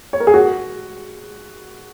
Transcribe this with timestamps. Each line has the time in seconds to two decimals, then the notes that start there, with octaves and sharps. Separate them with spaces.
0.13 C#5
0.20 A#4
0.27 G#4
0.34 F#4